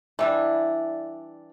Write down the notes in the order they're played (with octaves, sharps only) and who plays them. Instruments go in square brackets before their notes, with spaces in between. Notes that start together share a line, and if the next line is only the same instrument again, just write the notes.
[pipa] E3 G3 D4 [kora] E4